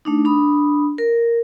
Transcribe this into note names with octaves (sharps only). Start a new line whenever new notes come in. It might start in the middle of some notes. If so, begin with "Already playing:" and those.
A3 D4 D#4
D4 B5 D#6
A#4